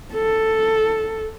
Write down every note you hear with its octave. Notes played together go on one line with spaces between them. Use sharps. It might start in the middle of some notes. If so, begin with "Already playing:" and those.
A4